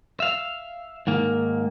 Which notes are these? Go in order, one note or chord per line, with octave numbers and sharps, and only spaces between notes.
E5 F5
G#2 D#3 A#3